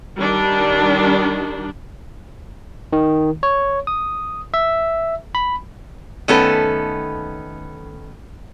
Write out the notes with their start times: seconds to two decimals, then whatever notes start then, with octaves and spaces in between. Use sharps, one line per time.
0.18 D#3 G3 D4
2.93 D#3
3.43 C#5
3.87 D#6
4.54 E5
5.35 B5
6.28 D#3 A3 B3 C#4 A4 B4